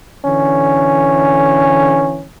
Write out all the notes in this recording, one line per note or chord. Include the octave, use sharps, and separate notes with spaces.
D3 E3 C#4